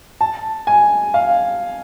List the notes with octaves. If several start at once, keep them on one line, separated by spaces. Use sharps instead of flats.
A5
G#5
F5